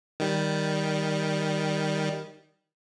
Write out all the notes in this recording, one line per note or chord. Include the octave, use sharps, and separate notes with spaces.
D#3 G3